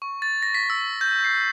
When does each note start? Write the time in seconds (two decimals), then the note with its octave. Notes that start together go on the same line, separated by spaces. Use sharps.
0.02 C#6
0.22 A6
0.43 A#6
0.55 B6
0.70 E6
1.01 G6
1.24 C7